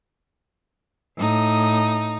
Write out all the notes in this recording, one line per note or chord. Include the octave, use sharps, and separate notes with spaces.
A2 D#4 D#6